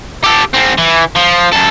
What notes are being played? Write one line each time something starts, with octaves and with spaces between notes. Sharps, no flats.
G4 A4
G#2 C4
E3
F3
F#2 A4